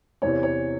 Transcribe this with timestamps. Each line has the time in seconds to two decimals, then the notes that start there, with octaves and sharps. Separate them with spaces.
0.22 E2 C3 E3 C#5
0.43 C#5